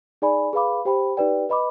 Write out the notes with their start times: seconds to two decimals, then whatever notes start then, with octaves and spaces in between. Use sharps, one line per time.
0.22 D#4 G#4 D5 G#5 B5
0.53 G#4 B4 F5 B5 D6
0.85 G4 C5 G5 B5
1.17 D#4 G4 B4 D5 G5
1.49 B4 D#5 B5 D6